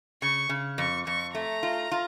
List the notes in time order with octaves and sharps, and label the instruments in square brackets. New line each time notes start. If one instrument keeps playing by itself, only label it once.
[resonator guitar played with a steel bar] C#3 [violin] C#6
[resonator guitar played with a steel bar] C#3
[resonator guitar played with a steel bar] F2 [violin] C#6
[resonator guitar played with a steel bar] F2 [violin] C#6
[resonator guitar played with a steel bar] A3 [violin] A#5
[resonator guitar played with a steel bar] F4
F4